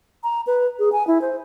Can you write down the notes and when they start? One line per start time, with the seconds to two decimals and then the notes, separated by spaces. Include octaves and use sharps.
0.24 A#5
0.47 B4
0.79 G#4
0.92 G#5
1.07 E4
1.22 C5